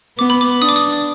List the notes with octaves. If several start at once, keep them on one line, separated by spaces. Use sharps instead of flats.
B3 D6
B5
D6
D4 D#6
D6
D#6